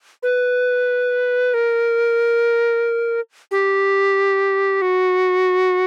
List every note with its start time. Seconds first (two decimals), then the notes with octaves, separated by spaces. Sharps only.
0.23 B4
1.54 A#4
3.51 G4
4.82 F#4